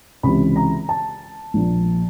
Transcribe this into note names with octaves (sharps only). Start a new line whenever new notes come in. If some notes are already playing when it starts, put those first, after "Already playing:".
C#2 C3 E3 B5
A#5
A5
A#1 A#2 F3